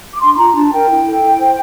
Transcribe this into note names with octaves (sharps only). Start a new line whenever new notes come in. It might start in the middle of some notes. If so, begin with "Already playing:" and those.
D6
D4 C6
C6
F4 A#5
D4 A5
A#4 G5
E4
A4
E4
C5